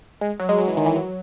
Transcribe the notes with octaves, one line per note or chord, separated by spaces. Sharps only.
G#3
F#3
G#3
F#3
E3
D#3
E3
F#3